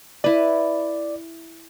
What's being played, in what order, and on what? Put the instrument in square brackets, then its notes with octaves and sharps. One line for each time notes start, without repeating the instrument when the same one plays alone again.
[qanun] E4 B4 [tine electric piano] D5